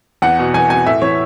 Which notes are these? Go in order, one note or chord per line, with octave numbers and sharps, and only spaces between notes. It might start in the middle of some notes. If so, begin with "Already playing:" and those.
E2 F#5
B2
E2 G#5
B2 G#5
A2 E5
E3 C#5